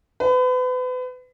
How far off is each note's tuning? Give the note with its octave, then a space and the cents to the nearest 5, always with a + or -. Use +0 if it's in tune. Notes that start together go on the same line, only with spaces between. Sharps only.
B4 +35